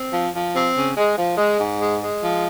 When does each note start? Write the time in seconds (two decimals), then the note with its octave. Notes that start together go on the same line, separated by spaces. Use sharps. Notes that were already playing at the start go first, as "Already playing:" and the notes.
Already playing: C4
0.13 F3
0.33 F3
0.55 C4
0.75 C#3
0.97 G#3
1.17 F3
1.37 G#3
1.59 G#2
1.80 G#3
2.00 G#3
2.21 F3